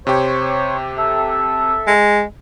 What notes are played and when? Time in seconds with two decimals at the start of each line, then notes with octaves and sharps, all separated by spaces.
0.07 C3 G4 C5 C#5 C#6
0.98 A4 E5
1.87 G#3